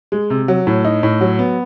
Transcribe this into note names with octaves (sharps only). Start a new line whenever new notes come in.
G#3
C3
F#3
A2
D#4
A2
F#3
B3